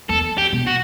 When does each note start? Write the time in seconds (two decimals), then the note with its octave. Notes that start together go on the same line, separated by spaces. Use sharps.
0.09 E2 A4
0.38 G4
0.52 B2
0.67 F#4